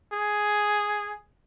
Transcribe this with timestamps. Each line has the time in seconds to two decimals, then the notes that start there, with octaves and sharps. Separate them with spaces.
0.13 G#4